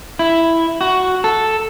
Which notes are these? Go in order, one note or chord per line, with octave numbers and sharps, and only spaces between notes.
E4
F#4
A4